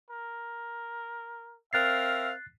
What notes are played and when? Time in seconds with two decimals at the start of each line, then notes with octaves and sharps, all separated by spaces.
0.10 A#4
1.73 C4 A#4 E5 F5 F#6 A6 C7